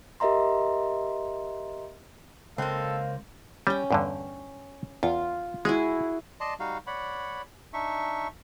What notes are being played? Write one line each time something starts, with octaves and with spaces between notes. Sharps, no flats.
G4 A#4 D#5 E5 A#5 C6
C#2 A#3 C4 A4 F5
G3 C#4 G5
E2 G2 D3
E2 F4
G#3 E4 F#4 G#4
D5 D#5 A5 C6
G3 D#4 F#4 F5
C#5 D5 F#5 B5
D4 D#4 E5 C#6